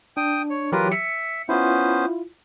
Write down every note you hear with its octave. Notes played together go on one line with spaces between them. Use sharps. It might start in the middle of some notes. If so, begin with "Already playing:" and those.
D4 G5 D#6
C#5
E3 F#3 F4 G4 A#4 B4
E5 C#7
B3 C#4 E4 F4 C5